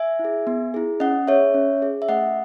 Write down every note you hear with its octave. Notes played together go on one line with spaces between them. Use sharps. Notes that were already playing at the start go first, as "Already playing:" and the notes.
Already playing: E5 G#5
E4
G#4
B3
E4 G#4
C#4 D#5 F#5
G#4 C#5 E5
C#4
G#4
E5
A3 D#5 F#5